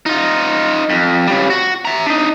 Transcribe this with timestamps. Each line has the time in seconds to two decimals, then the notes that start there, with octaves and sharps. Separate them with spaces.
0.06 D#4 F4
0.90 F2
1.28 C#3 G3
1.50 F#4
1.85 E5 A#5
2.06 D4 D#4